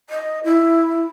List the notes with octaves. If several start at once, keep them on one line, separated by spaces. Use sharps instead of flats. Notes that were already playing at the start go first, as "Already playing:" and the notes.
D#5
E4